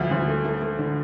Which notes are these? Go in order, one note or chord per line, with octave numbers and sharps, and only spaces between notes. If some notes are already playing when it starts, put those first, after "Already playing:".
Already playing: D2 F3
D2
A3
A3
A3
D3